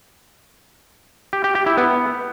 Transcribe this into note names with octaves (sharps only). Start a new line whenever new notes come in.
G4
G4
G4
E4
B3